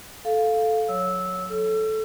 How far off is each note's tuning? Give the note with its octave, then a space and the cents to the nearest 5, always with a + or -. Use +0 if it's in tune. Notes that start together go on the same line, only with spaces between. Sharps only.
A4 -5 F5 +0
F#3 -30 C#5 +0 E6 -15
A4 -10 E6 +35